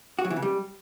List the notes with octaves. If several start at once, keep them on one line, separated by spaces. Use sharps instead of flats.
F#4
F#3
E3
C#3
G3